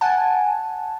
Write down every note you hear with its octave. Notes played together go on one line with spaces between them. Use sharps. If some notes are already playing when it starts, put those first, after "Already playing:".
F#5 G#5 A5